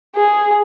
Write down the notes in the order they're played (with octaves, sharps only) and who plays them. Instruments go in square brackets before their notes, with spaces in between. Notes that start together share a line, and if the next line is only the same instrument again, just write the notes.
[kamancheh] G#4